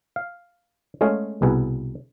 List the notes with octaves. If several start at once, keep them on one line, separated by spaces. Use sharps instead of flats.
F5
G#3 A3 C#4 G#4 F5
C2 B2 G#4 B4